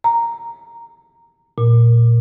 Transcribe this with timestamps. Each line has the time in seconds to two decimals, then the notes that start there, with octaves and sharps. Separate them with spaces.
0.04 A#5
1.58 A#2